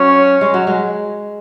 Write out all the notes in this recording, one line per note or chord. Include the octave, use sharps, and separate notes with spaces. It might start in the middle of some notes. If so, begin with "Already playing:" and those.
Already playing: F#3 C#4
G#3
F#3
G#3